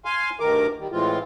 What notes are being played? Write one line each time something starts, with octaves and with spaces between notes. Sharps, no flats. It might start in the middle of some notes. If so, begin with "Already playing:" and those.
F5 G#5 C6
D2 G2 D#3 A#4 D6
D#3 G3
A2 E3 G#3 C4 F4